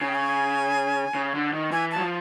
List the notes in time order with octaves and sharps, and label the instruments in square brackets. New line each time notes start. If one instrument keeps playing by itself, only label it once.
[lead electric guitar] C#3 [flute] G#5
[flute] G5
G#5
[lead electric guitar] C#3
D3
D#3
[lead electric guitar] E3 [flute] G#5
[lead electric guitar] F#3 [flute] A5
[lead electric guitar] F3